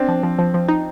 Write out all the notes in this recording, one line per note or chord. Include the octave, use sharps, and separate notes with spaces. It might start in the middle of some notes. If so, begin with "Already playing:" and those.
Already playing: C4 D4
F3
F3
F3
F3
D#4